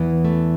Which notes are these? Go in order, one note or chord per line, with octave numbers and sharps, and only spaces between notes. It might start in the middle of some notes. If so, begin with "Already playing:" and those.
Already playing: E2 E3 B3
A3